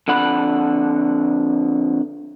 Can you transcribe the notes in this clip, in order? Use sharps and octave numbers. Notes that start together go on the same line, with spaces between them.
F2 D3 F#5 B5